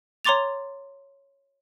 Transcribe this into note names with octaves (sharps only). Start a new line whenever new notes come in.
C#5 A#5 C6 D6 A6 F7